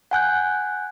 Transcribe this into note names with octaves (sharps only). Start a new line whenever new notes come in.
F#5 G#5 F#6 G6